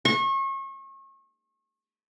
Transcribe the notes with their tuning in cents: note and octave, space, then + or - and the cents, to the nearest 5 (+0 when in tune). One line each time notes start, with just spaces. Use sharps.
C#6 -35